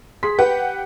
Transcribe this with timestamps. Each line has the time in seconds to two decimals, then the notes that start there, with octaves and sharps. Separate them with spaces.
0.23 G#4 C6 B6
0.39 G4 B4 F#5 G5